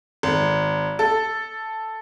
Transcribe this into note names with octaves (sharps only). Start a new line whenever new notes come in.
G#1
A4